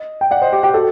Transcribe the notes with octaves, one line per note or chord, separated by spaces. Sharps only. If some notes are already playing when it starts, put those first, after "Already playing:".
Already playing: D#5
G5
D5 F#5
C5 D#5
G4
G4
F#4 A4